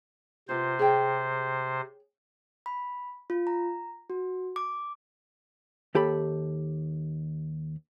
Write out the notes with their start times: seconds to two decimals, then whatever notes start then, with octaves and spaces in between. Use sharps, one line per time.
0.49 C3 B3 F4 C5
0.79 G#4 C#5 G5
2.66 B5
3.30 F4
3.47 A#5
4.10 F#4
4.56 D6
5.95 D#2 G4 A4 B5